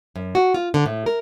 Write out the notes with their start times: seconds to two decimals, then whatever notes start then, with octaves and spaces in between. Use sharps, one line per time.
0.16 F#2
0.35 F#4
0.54 F4
0.74 D3
0.86 A2
1.06 A#4